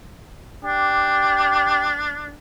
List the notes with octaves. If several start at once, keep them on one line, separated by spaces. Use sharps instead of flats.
D4 G4